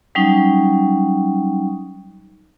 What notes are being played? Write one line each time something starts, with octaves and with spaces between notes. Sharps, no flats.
F#3 G3 C#4 D#4